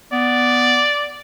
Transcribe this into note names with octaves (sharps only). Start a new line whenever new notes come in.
B3 D5